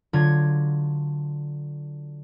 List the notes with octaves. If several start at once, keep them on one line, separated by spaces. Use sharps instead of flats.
D3 F#3 F4 G#6